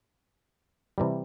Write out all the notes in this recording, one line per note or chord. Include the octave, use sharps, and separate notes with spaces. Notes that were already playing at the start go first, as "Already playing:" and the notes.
C3 E3 G3